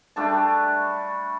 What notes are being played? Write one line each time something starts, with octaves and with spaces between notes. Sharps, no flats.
G3 A3 D4 A5